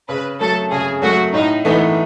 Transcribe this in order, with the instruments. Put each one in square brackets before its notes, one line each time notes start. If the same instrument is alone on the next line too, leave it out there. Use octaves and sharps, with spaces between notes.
[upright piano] C#3 [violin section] B4
[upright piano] F#3 A3 [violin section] A4
[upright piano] C#3 [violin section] G#4
[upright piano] F#3 A3 [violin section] F#4
[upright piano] A2 [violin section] D#4
[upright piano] E3 A3 D#4 [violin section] B3